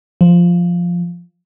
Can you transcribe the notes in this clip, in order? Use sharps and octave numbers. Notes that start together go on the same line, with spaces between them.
F3